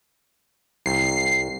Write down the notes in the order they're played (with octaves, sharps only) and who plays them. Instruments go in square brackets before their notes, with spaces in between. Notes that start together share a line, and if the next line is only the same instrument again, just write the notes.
[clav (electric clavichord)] C2 [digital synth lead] C7